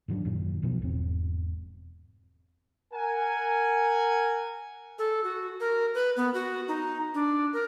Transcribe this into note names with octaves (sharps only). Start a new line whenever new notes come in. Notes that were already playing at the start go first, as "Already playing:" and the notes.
G#2 D#3 F#3 D4
F#2 A#2 D#3
B1 B2 F3 B3
E1 G#2 C4
A#4 F#5 G#5
A4
F#4
A#4
B4
B3
F#4
D#4
D4
A#4